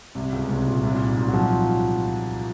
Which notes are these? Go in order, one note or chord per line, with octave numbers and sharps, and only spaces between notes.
C2 C3
C#2 C#3
C2 C3
A#2
C2 C3
A#2
G#2
A#2
F#3
F3